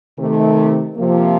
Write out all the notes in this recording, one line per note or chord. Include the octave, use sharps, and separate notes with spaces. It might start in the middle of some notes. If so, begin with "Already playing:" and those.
C3 D#3 A3
C3 F3 A#3